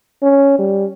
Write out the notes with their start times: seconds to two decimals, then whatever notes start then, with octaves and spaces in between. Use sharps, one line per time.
0.22 C#4
0.59 G3